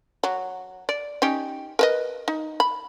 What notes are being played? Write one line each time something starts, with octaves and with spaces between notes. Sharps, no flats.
F#3
D5
C#4 D#4 G4
A#4 B4 D#5
D#4
B5